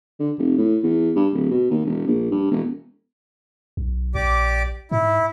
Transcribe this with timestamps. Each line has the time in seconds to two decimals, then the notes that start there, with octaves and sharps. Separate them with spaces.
0.19 D3
0.38 F1
0.58 A2
0.83 E2
1.16 G2
1.33 D1
1.51 B2
1.71 D#2
1.85 E1
2.07 A#1
2.31 G2
2.51 E1
3.77 B1
4.15 A#1 G4 D5 D6
4.91 G#2 E4